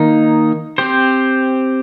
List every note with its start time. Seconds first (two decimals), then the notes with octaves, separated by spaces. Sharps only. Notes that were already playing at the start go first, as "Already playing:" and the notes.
Already playing: D#3 A#3 D#4
0.78 C4 G4 C5